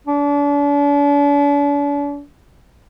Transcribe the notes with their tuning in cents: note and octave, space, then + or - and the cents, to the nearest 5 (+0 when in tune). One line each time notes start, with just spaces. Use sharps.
D4 -40